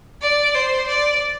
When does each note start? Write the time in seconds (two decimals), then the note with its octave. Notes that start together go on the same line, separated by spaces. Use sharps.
0.22 D5
0.55 C5
0.88 D5